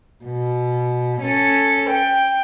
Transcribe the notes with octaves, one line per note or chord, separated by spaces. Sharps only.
B2
C#4 A4
G5